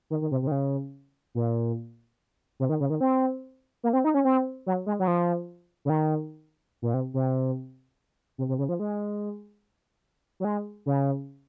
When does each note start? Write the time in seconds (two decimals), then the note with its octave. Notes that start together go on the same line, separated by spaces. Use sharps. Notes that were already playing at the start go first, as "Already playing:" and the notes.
0.10 D#3
0.21 D#3
0.31 C3
0.42 C3
0.47 D#3
0.52 C#3
1.35 A#2
2.60 C3
2.69 D#3
2.80 C#3
2.90 D#3
3.01 C4
3.83 A#3
3.93 C4
4.04 D#4
4.14 C#4
4.25 C4
4.66 F#3
4.86 G#3
5.00 F#3
5.07 F3
5.85 C#3
5.89 D#3
6.82 A#2
6.94 C3
7.14 C3
8.38 C3
8.49 C3
8.59 C#3
8.69 F3
8.80 G#3
10.40 F#3
10.45 G#3
10.86 C#3